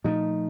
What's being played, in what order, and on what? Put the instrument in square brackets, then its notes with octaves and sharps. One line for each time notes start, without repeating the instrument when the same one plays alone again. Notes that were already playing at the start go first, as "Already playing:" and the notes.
[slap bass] A#2 F3 A3 [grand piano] D#4